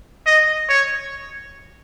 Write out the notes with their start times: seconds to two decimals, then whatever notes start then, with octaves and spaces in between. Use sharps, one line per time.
0.26 D#5
0.69 C#5